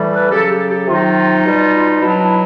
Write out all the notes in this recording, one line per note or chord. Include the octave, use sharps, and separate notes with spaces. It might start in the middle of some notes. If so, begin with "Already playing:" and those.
Already playing: A2 E3 G3
A4 B4
C#3 F#3 G4 A4
G4 A4
G4 A4
C3 D#3 F#3 D#4 F4
B2 G3
B2 F#3 D4 E4
D4 E4